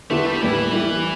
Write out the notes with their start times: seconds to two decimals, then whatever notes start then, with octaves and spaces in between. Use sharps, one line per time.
0.10 D3 A3 B3 E4 G4
0.26 G3
0.41 A2 E3 G3 B3 D4 G4
0.73 G3 E4 G4